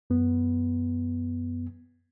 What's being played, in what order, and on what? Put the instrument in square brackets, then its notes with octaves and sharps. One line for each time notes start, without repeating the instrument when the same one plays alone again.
[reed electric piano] F#2 B3